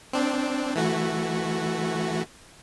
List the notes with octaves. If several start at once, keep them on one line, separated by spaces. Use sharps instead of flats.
C4 D4
E3 A3 F#4